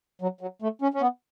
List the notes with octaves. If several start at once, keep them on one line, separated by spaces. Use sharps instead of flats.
F#3
F#3
A3
C#4
C#4
B3